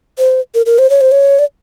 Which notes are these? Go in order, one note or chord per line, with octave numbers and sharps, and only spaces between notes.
C5
A#4
A#4
C5
C#5
C5
C#5
D5